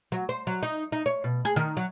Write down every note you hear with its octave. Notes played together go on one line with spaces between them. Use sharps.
F#3
C5
F#3
D#4
D#4
C#5
B2
G#4
D#3
F#3